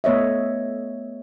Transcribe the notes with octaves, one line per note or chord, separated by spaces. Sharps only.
A3 B3 C#5 D#5 E5